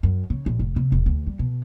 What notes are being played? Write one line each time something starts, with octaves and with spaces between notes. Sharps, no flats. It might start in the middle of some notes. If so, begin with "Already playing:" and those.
F#2
C#3
A#1
F1
C3
E1
D2
G3
B2